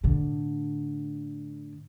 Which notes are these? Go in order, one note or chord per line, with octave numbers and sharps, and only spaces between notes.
A2 D3